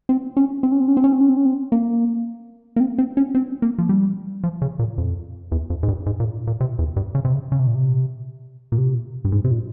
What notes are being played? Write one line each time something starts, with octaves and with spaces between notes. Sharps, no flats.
C4
C#4
C4
C#4
C4
C#4
C4
C#4
C4
C#4
C4
C#4
C4
A#3
A#3
C4
C4
C#4
C4
A#3
F3
G3
F3
C#3
A#2
F2
E2
F2
G#2
G2
G#2
A#2
A#2
C3
E2
G2
C#3
C3
C#3
C#3
C3
A#2
C3
A#2
C3
G2
G#2
C3
A#2